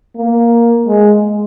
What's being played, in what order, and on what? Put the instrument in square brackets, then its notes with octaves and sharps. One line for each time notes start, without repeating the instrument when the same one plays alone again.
[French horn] A#3
G#3